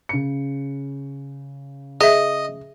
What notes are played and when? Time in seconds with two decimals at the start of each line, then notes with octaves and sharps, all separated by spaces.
0.09 C#3 C#7
2.01 G#4 D#5 E5